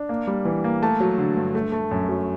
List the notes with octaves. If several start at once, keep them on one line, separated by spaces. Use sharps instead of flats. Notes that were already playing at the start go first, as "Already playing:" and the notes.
Already playing: D4
A#3
G3
E3
A#3
A3 A5
F#3
D3
G2
A3
A3
F#2
F#3